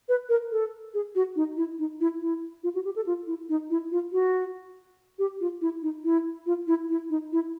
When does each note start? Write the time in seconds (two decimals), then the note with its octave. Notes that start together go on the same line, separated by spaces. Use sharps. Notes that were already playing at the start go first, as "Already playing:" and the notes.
0.09 B4
0.29 A#4
0.52 A4
0.94 G#4
1.15 F#4
1.36 D#4
1.57 E4
1.79 D#4
2.00 E4
2.21 E4
2.64 F4
2.75 F#4
2.85 G4
2.96 A4
3.06 F4
3.27 E4
3.49 D#4
3.70 E4
3.92 F4
4.12 F#4
5.19 G4
5.41 F4
5.61 E4
5.82 D#4
6.04 E4
6.46 F4
6.67 E4
6.90 E4
7.10 D#4
7.32 E4